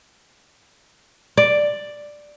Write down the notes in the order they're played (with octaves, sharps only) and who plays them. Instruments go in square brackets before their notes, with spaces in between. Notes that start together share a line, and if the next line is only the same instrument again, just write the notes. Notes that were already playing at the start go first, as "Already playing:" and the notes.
[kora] D5